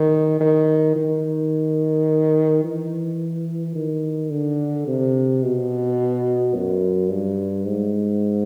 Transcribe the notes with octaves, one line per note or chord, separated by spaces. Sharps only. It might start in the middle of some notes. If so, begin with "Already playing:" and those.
Already playing: D#3
D#3
D#3
E3
D#3
D3
C3
B2
F#2
G2
G#2